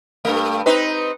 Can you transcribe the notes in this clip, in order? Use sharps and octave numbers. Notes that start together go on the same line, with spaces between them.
G2 A3
C4 D#4 B4